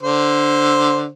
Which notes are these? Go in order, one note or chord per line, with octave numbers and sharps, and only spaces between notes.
D3 C5